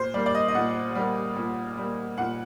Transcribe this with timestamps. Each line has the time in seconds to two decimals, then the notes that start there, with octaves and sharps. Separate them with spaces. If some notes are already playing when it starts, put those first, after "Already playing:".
Already playing: A#2 C5
0.14 G3 A#3 D5
0.26 D5
0.35 D#5
0.48 D#5
0.55 A#2 F#5
0.96 G3 A#3
1.36 A#2
1.77 G3 A#3
2.18 A#2 F#5